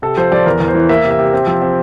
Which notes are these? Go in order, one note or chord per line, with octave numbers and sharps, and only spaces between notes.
C3 A4
F3 C5
F3 D5
E2 A#4
E2
C5
E3
A#3 E5
C3
E5
C3
C4
F3
C4